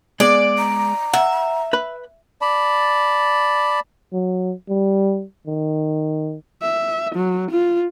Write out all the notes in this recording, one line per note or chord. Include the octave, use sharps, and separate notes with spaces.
G#3 B3 G#4 D5
A#5
E5 F#5
B4 B5
D5 A5 B5
F#3
G3
D#3
E5
F#3
F4